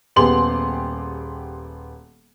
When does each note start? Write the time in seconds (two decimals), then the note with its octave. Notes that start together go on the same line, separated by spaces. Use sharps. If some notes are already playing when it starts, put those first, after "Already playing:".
0.16 D#1 B3 G4 G#4 C6 F#7